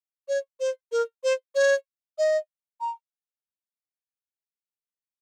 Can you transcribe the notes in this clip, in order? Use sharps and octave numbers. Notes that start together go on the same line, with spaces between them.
C#5
C5
A#4
C5
C#5
D#5
A#5